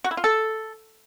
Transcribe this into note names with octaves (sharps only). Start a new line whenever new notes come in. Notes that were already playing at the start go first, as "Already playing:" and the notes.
F#4
E4
F4
A4